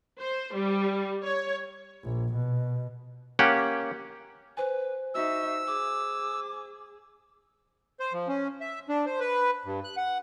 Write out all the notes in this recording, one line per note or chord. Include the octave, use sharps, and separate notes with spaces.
C5
G3
C#5
A#1
B2
A#3 C#4 G4 F#5
B4 C5 G#5
D#4 F#4 E5 E6
G#4 D6
C5
F3
C#4
E5
D4
C5
B4
G2
F#6
F#5